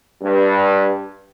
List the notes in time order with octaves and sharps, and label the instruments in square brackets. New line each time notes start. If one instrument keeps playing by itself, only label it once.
[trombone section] G2